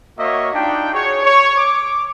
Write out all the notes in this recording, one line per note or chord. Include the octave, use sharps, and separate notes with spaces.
A#3 F#4 C#5 D#5 E5
D4 D#4 F4 G5
F#4 G#4 C#5
C#5
D6